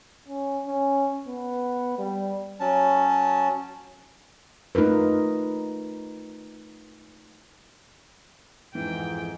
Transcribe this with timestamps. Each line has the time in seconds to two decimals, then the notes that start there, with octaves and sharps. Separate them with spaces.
0.28 C#4
0.66 C#4
1.27 B3
1.98 G3
2.60 F#3 C#4 A5
4.75 A3 D#4 F4 A#4 B4
8.75 F2 G#2 E3 G5